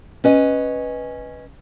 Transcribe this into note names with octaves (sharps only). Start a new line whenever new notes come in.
C#4 B4 D#5